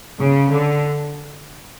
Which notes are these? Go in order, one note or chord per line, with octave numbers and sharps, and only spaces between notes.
C#3
D3